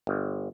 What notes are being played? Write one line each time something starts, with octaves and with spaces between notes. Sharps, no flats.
G1